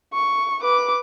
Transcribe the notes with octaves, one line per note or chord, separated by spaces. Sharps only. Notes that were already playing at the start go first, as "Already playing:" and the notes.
C#6
B4 D6